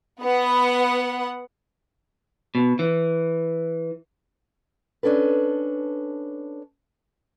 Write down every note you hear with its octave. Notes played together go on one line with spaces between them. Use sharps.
B3 F#5
B2
E3
C#4 D4 A4 B4